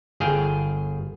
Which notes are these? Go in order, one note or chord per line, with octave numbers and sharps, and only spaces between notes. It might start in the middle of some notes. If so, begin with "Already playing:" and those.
G1 G#4 F5 G5